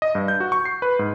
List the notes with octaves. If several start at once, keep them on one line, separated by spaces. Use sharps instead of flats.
D#5
G2
G6
F#4
C#6
C7
B4
G#2